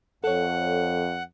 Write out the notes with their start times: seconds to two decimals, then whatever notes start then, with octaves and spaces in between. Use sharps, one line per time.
0.24 F2 A4 C#5 F#5